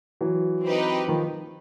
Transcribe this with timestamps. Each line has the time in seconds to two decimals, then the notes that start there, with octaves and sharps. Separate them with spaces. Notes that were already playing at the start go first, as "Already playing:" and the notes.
0.21 E3 F#3
0.64 C4 D#4 G4 B4
1.08 D#3 F3